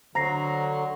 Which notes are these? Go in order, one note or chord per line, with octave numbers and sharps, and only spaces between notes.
D3 F#3 C5 A#5 A#6 C7